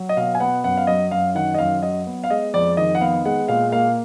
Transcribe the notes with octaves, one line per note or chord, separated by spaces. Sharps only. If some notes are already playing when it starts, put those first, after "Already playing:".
Already playing: F#3
D#5
B2 F5
G#5
B3 F#5
F#2 F#5
F5
F#3 D#5
F#2 F5
D#3 F#5
D#5
F#2 F5
F#3 D#5
B3
F5
G#3 D#5
F2 D5
D#3 D#5
F#5
B3 F5
G#3 F#5
A#2 F5
A#3 F5